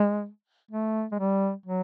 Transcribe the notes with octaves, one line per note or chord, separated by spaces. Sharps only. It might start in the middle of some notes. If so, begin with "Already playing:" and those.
Already playing: G#3
A3
G#3
G3
F#3